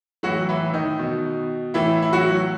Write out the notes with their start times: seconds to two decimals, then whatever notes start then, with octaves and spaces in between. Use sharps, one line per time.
0.23 A2 E3 F#3 F#4
0.49 E3 E4
0.73 D#3 D#4
0.99 B2
1.74 A2 E3 E4
2.02 E4
2.13 F#3 F#4